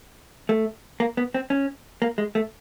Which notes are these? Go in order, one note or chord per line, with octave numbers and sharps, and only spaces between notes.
A3
A#3
B3
C4
C#4
A#3
G#3
A3